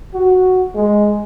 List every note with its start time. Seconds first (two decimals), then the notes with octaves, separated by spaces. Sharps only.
0.14 F#4
0.75 G#3